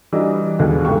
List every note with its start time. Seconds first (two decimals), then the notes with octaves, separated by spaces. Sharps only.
0.12 E3 G3 D4 D#4 F#4
0.59 D#2 B2 D3 G#3
0.85 F1 G#2 C#3 G3 G5 C#6